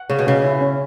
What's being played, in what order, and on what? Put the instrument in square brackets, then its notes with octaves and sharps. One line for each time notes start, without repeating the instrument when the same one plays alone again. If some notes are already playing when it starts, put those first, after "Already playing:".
Already playing: [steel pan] F#5
[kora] C#3 [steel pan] C#5
[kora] B2
[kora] C#3 [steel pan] C#4
[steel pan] E4
C#4